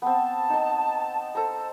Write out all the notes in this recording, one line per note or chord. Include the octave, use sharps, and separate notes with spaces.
B3 C4 A5
D#4 D#5
A4 C5 A#5